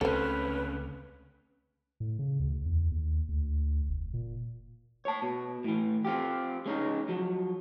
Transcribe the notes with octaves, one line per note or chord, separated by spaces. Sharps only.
C#2 D3 A3 C4 C#4 A4 B4 C5
A2
C#3
D2
E2
D#2
D2
F1
A#2
C#5 A5
B2
A2 E3
C4 F4 G4
G#3 C#4 D#4
F3 F#3